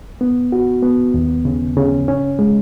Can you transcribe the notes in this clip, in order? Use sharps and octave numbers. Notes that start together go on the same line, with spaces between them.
B3
F#4
B3
D#2
C#3
C#3
C#4
G#3